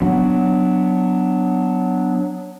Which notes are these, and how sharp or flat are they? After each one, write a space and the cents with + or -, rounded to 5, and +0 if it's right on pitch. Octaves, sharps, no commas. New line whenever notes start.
F#3 +0 B3 +5 D4 +0